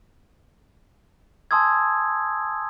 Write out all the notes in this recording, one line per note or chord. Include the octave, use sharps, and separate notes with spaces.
G#5 A5 C6 D#6 E6 G#6